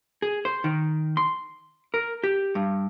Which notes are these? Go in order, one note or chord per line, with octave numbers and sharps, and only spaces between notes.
G#4
C5
D#3
C6
A#4
G4
G2